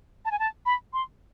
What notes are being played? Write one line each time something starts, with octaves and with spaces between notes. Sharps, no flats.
A5
G#5
A5
B5
C6